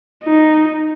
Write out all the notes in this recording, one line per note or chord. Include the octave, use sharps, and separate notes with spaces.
D#4